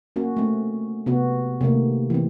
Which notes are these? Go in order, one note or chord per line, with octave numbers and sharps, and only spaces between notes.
A#3 C#4 F#4
A3 C4
C3 B3 F#4
C3 D#3 A3 A#3
E3 C4